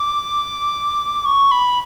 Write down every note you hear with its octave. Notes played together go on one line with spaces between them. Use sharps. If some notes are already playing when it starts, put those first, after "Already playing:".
Already playing: D6
C#6
B5